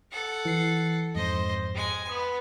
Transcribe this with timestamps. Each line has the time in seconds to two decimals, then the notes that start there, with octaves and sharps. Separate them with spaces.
0.12 A4 F#5
0.45 E3 C7
1.15 F2 G#2 C5 D#5
1.75 G#3 G#5
2.09 B3 D#6